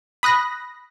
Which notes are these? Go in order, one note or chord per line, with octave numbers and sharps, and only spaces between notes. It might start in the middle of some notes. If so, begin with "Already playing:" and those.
B5 D#6 F#6 A#6